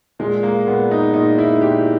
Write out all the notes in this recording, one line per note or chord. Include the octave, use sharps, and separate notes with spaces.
A#2 G#3
A#3
A#2 B3
D#4
A#2 D#4
E4
A#2 G4